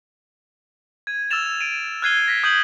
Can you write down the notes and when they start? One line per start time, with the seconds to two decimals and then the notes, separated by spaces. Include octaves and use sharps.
1.07 G#6 D#7
1.31 E6 F6 G#6 A6 E7 F7
1.61 D7 D#7
2.02 F6 F#6 G#6 C7 D#7 G7
2.28 A#6 B6
2.44 D#6 G6 G#6 D#7 F#7